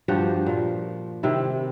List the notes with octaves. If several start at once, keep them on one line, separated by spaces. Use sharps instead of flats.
G2 F3 F#4 G4
A#2 F3
C3 D#3 E4